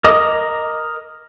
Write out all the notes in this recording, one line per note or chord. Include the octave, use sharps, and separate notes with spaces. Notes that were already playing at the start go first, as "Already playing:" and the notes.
A#4 D#5 D6 D#6